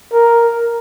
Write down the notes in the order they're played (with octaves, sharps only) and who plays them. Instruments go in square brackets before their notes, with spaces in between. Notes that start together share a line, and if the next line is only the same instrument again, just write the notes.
[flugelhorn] A#4